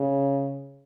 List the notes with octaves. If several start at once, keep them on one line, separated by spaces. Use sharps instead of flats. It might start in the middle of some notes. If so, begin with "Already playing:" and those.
Already playing: C#3